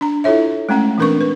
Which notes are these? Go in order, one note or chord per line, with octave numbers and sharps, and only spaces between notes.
D4 A#5
E4 F4 A4 C#5 E5
G#3 A3 C#4 F#5
E3 C4 D4 A#4 B4 C#6
B4